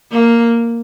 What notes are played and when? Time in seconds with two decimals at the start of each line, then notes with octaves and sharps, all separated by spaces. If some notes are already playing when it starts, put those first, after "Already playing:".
0.11 A#3